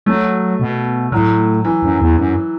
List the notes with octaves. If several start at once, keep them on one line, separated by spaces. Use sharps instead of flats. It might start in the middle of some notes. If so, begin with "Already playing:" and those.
F#3 A3
B2
A2 F#3
E3
F#2
E2
F#2